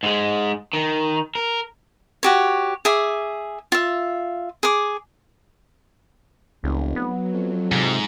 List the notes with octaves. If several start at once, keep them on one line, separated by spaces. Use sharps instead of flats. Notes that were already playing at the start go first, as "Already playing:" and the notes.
G#2 G#3
D#3
A#4
F#4 G4 C#5
G#4 E5 D6
F4 E5
G#4 D6
F1 C#2
F#3 B3
F2
G#2 C3